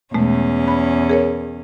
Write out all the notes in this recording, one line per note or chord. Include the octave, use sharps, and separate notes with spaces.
E2 B2 G#3 A3 C#4
B5
G#4 A#4 C#5